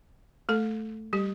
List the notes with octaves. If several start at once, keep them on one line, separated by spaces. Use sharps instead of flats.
A3 A4
G3 G4